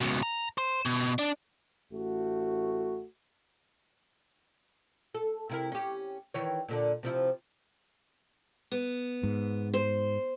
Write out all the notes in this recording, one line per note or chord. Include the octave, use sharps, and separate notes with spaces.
C#2 B2
A#5
C5
B2
D4
A1 A3 F#4
A4
C3 E4 A#4
C#4 G4
D#3 E3 C#5
A#2 D3 D4
C3 F3 E4
B3
G#2
C5